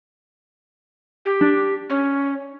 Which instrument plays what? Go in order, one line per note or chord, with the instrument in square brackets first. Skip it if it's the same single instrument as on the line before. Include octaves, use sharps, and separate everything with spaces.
[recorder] G4
[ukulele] D4
[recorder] C#4